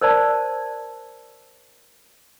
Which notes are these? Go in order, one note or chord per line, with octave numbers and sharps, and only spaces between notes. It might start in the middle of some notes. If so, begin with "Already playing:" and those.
A#4 C5 D5 A5